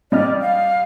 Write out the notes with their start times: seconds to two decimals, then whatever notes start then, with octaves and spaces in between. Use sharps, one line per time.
0.12 G3 D5 D#5 F6
0.41 F5